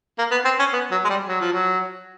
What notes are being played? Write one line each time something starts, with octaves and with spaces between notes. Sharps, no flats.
A#3
B3
C4
C#4
B3
F#3
G#3
G3
F#3
F3
F#3